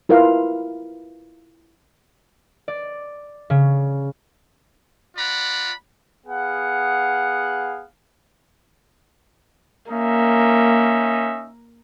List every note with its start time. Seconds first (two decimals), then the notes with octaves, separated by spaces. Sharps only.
0.09 E4 F4 A#4 B4 F5
2.68 D5
3.50 C#3
5.17 F4 D5 F#5 A#5 B5
6.26 B3 G#4 F5 F#5
9.91 A#3 C#4 D#4 E5